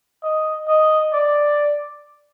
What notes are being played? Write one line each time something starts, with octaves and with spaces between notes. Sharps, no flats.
D#5
D#5
D5